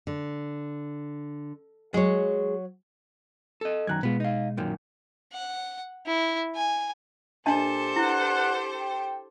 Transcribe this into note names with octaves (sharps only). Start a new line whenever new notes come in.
D3
F#3 G#3 C#5
A4 D#5
F#2 D#3 A#5 F#6 G#6
B2 G#3 B3 F4
D#4 F5
F#2 A#2 D#3
F#5
E4
G#5
A#2 D4 G4 A4 C5 D#5 A5
D4 E4 B4 F#5
G5